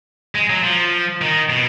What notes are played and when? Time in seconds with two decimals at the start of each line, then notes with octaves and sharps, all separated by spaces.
0.35 G#3
0.50 F#3
0.64 F3
1.21 D#3
1.50 B2